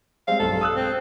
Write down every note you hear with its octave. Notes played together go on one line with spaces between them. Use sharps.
G3 G#3 C4 F5
B1 G2 A4
D#6 E6 F#6
C4